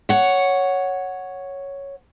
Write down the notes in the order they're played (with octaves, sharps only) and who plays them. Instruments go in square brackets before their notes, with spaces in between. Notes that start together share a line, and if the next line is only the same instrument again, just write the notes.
[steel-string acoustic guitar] C#5 F#5